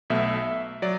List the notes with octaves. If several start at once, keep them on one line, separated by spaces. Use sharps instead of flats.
B1 B2 A3 E5
F#3 D5